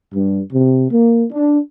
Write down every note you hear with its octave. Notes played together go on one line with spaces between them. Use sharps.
G2
C3
A#3
D4